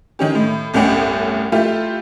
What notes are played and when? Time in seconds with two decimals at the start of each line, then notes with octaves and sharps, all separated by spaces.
0.19 D#3 C#4 G4
0.35 A2
0.74 G1 C2 A2 C#4 F#5 G5
1.52 A3 E4 F4 G4